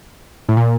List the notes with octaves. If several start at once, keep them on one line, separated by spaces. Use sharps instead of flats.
A2
A#2